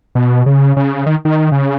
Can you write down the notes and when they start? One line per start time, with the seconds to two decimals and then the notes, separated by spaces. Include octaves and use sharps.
0.15 B2
0.46 C#3
0.77 C#3
1.06 D#3
1.25 D#3
1.52 C#3